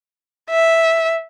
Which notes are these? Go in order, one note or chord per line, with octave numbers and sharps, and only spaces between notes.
E5